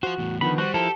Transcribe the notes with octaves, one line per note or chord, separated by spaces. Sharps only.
F4 F#4 C5
E2 A2
D3 D#3 F3 B3 B5
G3 F#4 C5
F3 E4 G4 A4 A#4